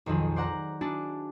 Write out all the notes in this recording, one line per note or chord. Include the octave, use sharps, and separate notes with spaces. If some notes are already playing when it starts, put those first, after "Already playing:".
B1 F2 D#3 F3 G#4
C5 D5 F#5 A#5
D4 E4 F#4 G#4 D5 A5